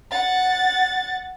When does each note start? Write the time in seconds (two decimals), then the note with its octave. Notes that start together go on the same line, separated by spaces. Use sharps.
0.11 F#5 A6